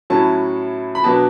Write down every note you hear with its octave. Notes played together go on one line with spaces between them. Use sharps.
A2 F#3 C#4 E4 A5
B5
B2 F#3 B3 D4 A5